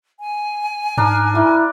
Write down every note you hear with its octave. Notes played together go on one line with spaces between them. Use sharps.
G#5
G#2 D4 A#4
A#3 E4